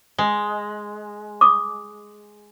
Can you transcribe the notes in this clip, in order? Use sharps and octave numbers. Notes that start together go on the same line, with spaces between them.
G#3
D6 D#6